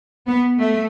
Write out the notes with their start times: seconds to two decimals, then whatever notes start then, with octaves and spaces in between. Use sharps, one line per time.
0.27 B3
0.59 A3